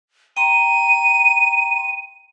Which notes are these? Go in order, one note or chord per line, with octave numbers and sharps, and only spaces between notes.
G5 A#5 C6 D#7